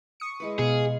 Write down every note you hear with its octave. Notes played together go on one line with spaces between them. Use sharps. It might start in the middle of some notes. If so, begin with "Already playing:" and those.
C#6 D#6 C#7
G#3 E4 B4
B2 G#4 F5